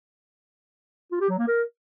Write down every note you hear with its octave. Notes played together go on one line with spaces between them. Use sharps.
F4
G4
F#3
A#3
A#4